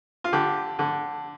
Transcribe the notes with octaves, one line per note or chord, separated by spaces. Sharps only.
F4
D3 G4
D3